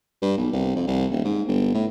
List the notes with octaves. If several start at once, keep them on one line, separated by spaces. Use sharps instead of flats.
G2
B1
C2
F2
C2
D#1
G#2
G1
A2